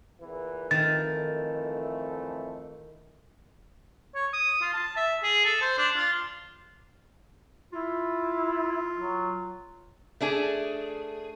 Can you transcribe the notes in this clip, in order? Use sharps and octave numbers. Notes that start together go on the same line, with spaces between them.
E2 A#2 E3
F2 D#3 E3 A3 A6
C#5
D#6
F4
A5
E5
G#4
A4
C5
D4
F4
E4 F4
F#3
A3 D4 G#4